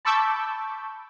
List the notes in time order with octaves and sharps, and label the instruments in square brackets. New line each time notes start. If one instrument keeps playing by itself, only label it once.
[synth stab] A5 B5 C#6 D6 E6 G6